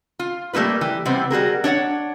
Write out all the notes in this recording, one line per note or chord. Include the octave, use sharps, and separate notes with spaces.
F4
G3 A3 A#3 F4 B4
E3 G4
C3 G3 B3 C4
G3 F#4 G#4 A#4
D4 C#5 D#5 F#5